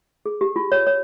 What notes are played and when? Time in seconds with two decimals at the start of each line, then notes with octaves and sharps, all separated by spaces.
0.26 G#4
0.41 G4
0.56 F4
0.72 C#5
0.87 C#5